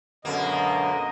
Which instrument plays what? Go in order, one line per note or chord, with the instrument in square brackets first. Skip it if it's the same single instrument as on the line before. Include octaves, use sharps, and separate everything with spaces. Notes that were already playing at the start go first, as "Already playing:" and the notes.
[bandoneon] F#2 D3 [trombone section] B2 G#3 C#4 [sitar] A#3 [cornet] D#5